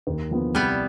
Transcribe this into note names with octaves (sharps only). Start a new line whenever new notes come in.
D#2
D3 F3 B3 F4
C2 G3 B3